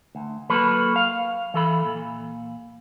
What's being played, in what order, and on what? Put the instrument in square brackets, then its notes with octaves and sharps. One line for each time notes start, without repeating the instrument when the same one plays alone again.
[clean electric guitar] D2
F#3 A#3 A4 B4
F5
E3 A4 B5
A#2